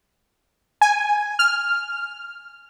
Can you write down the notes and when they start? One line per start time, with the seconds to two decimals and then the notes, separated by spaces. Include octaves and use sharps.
0.81 G#5
1.39 F6